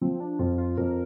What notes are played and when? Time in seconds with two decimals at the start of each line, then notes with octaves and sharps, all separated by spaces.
0.01 F3 C4
0.20 D4
0.39 F2 F4
0.58 F4
0.78 F2 A#4